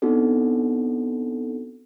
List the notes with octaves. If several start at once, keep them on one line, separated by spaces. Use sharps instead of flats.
B3 C4 D4 D#4 F#4 A4